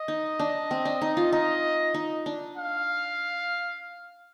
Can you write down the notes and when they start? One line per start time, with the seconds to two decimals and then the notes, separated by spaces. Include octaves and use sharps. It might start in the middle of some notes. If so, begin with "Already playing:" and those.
Already playing: D#5
0.08 D#4
0.39 D4
0.71 C4
0.85 D4
1.02 D#4
1.17 F4
1.32 D#4 D#5
1.94 D#4
2.26 D4
2.57 F5